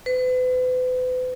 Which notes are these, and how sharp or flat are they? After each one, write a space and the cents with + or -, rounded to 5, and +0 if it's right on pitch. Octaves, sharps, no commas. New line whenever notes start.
B4 +40